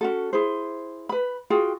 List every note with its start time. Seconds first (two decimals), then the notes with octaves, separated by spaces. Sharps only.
0.01 C#4 F#4 A4
0.33 E4 G#4 C5
1.09 B4 B5
1.50 F4 F#4 G#4 G5